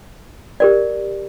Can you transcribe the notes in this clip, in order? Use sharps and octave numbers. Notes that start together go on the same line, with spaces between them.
G4 A#4 D5